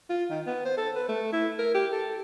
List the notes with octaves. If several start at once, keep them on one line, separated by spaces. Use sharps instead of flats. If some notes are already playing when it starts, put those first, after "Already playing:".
F4
D#3
B3
C5
A4
B4
A3
E4
A#4
G4
A4